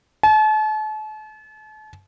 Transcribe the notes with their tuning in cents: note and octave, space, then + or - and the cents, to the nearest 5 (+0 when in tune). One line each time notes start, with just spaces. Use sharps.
A5 -40